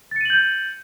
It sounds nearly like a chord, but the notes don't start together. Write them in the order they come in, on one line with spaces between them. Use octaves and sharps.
A6 C#7 D#7 F#7 G6